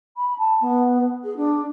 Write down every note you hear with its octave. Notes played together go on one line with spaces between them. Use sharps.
B5
A5
B3
G#4
D4